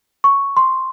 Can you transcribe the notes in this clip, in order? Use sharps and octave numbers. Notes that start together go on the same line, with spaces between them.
C#6
C6